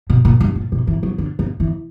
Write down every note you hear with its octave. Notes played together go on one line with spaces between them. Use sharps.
B2
A#2
G2
A#2
B2
E3
F#3
D3
C#3
E3